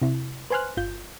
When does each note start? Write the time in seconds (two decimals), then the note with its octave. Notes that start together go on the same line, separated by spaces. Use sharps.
0.02 C3 E4
0.50 B4 C5 G#5 C6 F6 F#6
0.77 G1 F4 G6